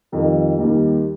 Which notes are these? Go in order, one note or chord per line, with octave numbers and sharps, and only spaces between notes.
F2 D#3 G3
D#2 D#3 G3